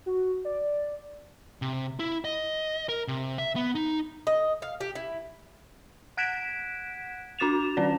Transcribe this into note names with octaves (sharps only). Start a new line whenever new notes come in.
F#4
D5
C3
E4
D#5
A#4
C3
E5
B3
D#4
D#5
F5
G4
E4
F#5 F#6 G#6 B6 D7 E7
D4 F#4 D6 A6 E7 F7
D#3 C#4 D5